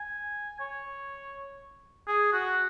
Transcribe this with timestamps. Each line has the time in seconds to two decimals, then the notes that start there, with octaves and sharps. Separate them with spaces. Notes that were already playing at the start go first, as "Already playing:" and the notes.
Already playing: G#5
0.60 C#5
2.07 G#4
2.33 F#4